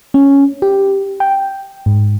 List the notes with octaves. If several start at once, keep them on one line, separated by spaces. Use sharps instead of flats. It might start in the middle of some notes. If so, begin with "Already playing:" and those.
C#4
G4
G5
G#2